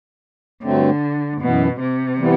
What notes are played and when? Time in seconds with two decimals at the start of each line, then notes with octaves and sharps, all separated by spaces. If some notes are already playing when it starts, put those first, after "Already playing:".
0.63 G2 D3 F#3 A3 C4
1.41 F#2 B2 E3 B3
1.80 C3
2.18 E3 G3 B3